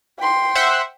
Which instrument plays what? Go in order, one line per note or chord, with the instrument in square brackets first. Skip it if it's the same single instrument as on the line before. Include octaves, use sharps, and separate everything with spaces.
[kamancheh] G5 C6
[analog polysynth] C5 E5 F#5